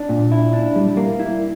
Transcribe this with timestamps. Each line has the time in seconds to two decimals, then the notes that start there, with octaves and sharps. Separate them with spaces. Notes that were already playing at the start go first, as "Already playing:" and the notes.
Already playing: D4
0.09 A#2
0.32 E4
0.53 D4
0.76 G3
0.97 A#3
1.20 E4